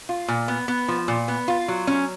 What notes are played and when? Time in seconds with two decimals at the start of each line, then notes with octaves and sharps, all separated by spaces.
0.09 F4
0.28 A#2
0.48 B3
0.68 B3
0.88 F3
1.08 A#2
1.28 B3
1.48 F4
1.68 F#3
1.87 C#4